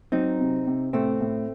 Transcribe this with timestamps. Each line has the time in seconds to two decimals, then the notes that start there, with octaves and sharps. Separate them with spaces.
0.12 F#3 C4 D#4
0.40 C3
0.67 C3
0.93 A2 A3 C4
1.21 A2